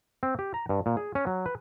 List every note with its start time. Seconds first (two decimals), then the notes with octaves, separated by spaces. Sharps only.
0.23 C4
0.39 G4
0.54 A#5
0.69 G2
0.86 A#2
0.97 G#4
1.15 C#4
1.27 F#3
1.46 B4